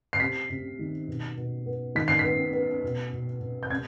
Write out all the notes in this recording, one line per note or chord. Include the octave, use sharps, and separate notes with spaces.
C7
C3 B6
C3
D#3
B2
B2
B3
D#3 B6
C7
B6
B3
B3
B2
B2
B2
G6
C3 G#6